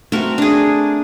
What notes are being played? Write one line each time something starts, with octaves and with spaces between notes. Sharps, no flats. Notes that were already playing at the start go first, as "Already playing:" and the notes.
A3 C4 F#4 A#4
D4 G#4